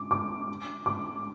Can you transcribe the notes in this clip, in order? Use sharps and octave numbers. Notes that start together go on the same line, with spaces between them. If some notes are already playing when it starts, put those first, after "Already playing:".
Already playing: D6
D6
D6